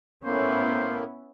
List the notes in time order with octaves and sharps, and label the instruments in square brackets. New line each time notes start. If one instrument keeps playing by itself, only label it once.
[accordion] A2 A#3 [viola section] B3 E4 [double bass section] C#4 [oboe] C5